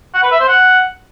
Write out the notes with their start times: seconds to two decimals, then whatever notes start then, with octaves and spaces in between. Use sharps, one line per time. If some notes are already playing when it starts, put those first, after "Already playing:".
0.15 F#5
0.23 B4
0.32 E5
0.40 C5
0.49 F#5